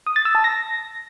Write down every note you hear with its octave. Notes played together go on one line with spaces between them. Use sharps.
D#6
A6
E6
A5
A#6